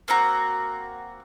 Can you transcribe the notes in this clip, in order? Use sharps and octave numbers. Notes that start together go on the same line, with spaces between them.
A#3 C4 F#4 A#5